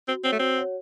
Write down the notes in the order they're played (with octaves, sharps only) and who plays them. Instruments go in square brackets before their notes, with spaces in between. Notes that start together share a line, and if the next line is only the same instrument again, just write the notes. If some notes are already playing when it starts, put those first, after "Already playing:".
[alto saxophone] C4 [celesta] F#4
[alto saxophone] C4 [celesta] C#5 F#5
[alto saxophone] A3
[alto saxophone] C4 [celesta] F#4
[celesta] C#5 F#5